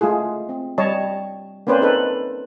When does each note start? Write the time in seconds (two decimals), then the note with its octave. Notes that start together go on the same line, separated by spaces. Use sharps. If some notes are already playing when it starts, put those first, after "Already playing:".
0.01 G#3 A3 F4 G#4
0.49 C4
0.78 G3 C#5 D#5 A5
1.67 A#3 C4 C#4 B4 C5 D5
1.81 D#4 A4 B4 C5